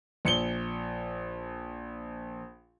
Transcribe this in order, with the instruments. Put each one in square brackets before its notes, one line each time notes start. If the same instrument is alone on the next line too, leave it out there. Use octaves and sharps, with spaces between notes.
[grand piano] A#1 C#7 G7